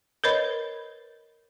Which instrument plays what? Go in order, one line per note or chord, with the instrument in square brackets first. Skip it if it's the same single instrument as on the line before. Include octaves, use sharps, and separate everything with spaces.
[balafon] A#4 B4 C#5 D#5 B5